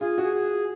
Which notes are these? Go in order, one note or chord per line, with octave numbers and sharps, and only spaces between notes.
F4 G#4
F#4
G#4